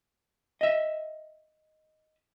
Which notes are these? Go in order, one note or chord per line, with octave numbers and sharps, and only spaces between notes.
D#5 E5